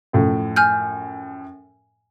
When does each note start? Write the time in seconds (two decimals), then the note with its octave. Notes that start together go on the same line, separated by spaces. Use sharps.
0.13 F#2 A2 F3
0.56 G#5 F6 G6